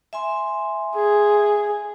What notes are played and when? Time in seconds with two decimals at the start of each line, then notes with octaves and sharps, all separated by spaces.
0.13 E5 G#5 C6
0.95 G#4